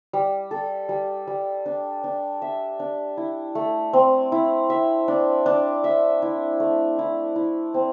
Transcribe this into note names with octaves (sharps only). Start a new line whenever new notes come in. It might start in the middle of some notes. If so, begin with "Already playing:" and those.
G3
A4
G3
G3
D4
D4
E5
D4
E4
A3
C4
E4
E5
D4
D4
E5
E4
A3
E4
E4
C4